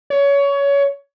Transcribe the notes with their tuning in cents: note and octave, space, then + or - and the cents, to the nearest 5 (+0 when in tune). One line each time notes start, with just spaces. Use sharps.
C#5 +20